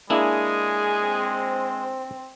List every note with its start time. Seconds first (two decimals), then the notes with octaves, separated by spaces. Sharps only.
0.10 G#3 A#3 D4 E4 G#4
1.04 C4 C5